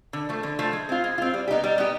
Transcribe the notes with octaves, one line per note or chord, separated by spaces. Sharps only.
D3
F3 A3
D3
F3 A3
G#3
C4 F4
G#3
C4 F4
G3
B3 D#4 G4
G3
B3 D#4 G4